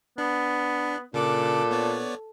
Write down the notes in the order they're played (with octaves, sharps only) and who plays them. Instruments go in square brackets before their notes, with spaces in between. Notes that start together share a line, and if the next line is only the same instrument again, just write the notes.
[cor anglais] B3 [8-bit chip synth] D4
[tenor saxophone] A#2 [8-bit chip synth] C#3 D6 F#6 [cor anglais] D4 [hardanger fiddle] A4
[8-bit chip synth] B3 C#5 D5